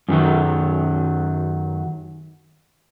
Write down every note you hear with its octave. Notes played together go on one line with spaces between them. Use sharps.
F#2 D3 D#3 F#3